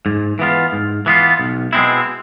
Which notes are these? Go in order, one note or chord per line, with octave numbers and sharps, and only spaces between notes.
G#2
E3 B3 F4
G#2
E3 B3 F4
B1
B2 G#3 C4 E4